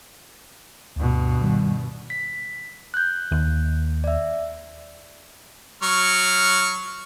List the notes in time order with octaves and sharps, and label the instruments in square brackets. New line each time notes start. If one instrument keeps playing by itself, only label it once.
[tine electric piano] D2 [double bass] G2 B2
[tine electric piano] D#3 G3
[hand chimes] B6
F#6 G6
[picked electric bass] D#2
[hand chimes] D5 E5
[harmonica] F#3 C#6 F6